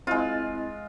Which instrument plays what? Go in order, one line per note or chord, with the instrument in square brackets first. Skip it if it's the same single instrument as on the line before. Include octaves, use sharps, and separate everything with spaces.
[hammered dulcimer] G#3 F4 [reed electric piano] C4 E4 D#5